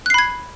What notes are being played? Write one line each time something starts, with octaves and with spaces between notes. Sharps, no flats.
B5 F#6 G#6 C7